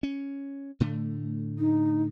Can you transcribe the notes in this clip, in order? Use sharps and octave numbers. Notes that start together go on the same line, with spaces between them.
C#4
A2 D3 A3
D#4